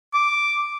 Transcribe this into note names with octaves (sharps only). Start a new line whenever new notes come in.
D6